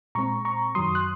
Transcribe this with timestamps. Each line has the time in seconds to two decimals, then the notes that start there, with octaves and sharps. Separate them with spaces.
0.15 A#2 G#3 C4 A#5 C#6
0.45 A#5 C#6
0.75 F#2 D#3 F#3 C6 D#6
0.95 F#6